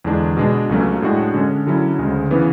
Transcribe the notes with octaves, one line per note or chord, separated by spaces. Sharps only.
E2 D3 G#3 D4
B2 G#3 D4
C#2 C#3 F#3 A3 C#4
A2 G#3 D4 F#4
D3 G#3 C#4
D3 F#3 C#4 E4
D2 C#3 G#3
C#3 E3 B3